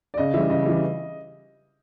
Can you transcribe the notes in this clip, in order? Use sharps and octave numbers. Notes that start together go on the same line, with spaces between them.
D5
C#3 D#5
E3 G3 E5
C#3 D#5
E3 G3